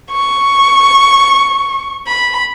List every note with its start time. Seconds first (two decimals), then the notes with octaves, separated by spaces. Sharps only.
0.12 C#6
2.08 B5